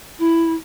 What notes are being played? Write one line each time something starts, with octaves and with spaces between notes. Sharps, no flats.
E4